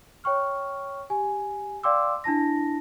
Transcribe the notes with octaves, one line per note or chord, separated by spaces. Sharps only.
C#5 G5 C#6 F6
G4 G#5
D5 F5 G5 C6 D6 E6
D4 E4 A5 A#6